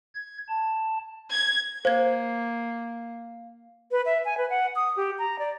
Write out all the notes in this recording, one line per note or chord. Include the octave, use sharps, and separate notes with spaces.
G#6
A5
G#6
A#3 C5 F5 G#6
B4
E5
G#5
B4
F#5
D#6
G4
A#5
D5